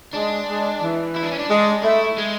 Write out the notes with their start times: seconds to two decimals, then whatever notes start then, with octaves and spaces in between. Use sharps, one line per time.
0.14 G#3 D4
0.48 G#3
0.82 E3
1.16 E4
1.23 D4
1.32 C#4
1.38 D4
1.50 G#3
1.83 A3 E4
2.18 G#3